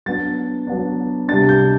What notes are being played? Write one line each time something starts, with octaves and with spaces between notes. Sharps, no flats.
F#3 B3 D4 A6
F#3 B3 D4
C3 G3 D4 A6
G6